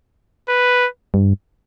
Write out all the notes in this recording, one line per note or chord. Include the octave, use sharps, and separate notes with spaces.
B4
G2